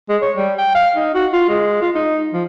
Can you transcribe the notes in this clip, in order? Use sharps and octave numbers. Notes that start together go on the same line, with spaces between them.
G#3
C#5
G3
G5
F5
D#4
F#4
F4
G#3
F4
D#4
F3